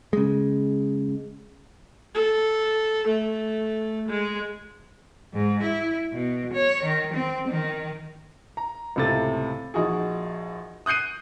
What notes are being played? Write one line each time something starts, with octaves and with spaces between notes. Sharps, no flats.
C#3 G#3
A4
A3
G#3
G#2
E4
B2
C#5
D#3
C4
D#3
A#5
C#2 A2 C3 A4 A6
A#1 D#4 F#4 G#4
D#6 F#6 G6 C7 D#7